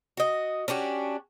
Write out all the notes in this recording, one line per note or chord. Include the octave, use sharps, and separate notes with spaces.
F#4 D#5
C#4 D4 F#4 G4